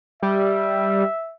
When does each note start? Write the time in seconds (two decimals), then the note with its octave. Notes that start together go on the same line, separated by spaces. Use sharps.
0.22 G3 E5